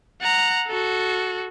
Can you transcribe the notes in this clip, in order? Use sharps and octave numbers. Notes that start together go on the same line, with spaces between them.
F#5 A#5
F#4 A4